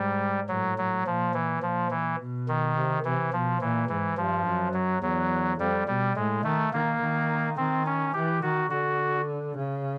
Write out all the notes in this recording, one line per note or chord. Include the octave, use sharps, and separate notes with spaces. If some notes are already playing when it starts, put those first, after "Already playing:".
Already playing: G#2 G3
A2 F#3
F#3
A#2 F3
E3
A#2 F3
E3
B2
D#3
C3
C3 E3
B2 F3
A#2 E3
G#2 E3
G2 F3
F#2
F#3
E2 F#3
F2 G3
B2 G3
A2 G#3
D#3 A3
D#3 A#3
D#3
D#3 C4
C#4
E3 G4
D#3 F#4
D3 F#4
C#3